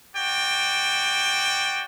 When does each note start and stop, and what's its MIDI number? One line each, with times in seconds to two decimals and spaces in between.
0.15 1.84 66
0.15 1.84 74
0.15 1.84 79